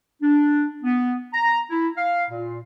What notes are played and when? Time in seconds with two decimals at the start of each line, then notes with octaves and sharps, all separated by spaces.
0.22 D4
0.83 B3
1.33 A#5
1.70 E4
1.96 F5
2.30 A#2